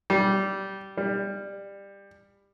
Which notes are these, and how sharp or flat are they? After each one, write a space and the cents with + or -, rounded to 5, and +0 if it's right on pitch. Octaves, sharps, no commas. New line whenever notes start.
G3 -15
G3 +20